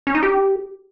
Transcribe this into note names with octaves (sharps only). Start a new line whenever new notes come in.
C#4
D#4
G4